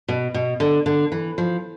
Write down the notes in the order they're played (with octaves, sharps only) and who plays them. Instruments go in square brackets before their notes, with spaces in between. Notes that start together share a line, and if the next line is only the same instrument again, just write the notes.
[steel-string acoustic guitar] B2
B2
D3
D3
E3
F3